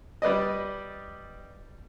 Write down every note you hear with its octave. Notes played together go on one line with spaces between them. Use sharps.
G3 B4 D5 D#5